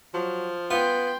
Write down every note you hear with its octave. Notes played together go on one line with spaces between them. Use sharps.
F3 F#3
B3 F4 G5 C6